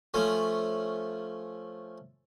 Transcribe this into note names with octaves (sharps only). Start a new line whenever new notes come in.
F3 A3 C#4